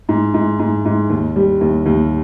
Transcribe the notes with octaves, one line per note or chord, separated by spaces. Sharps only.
G#2
G#2
G#2
G#2
D#2
G3
D#2
D#2